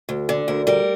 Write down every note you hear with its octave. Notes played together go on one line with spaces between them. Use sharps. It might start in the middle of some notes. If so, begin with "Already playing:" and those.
D2
D3
D2 A#4
G3 A#4